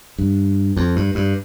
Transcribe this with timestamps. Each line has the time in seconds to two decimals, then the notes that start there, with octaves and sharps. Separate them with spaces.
0.18 G2
0.77 F2
0.96 G2
1.15 G2